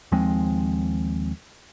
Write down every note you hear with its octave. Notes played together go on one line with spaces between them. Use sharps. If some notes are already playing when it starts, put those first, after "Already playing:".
D#2 F3 G#3 C4